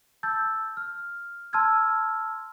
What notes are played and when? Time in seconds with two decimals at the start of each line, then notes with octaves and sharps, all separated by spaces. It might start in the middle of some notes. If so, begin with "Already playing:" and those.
0.23 A5 E6 G6 A6
0.77 F6
1.53 A5 C6 E6 F6 G#6